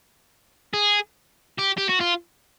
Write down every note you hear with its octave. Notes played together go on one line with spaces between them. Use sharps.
G#4
G4
G4
F#4
F4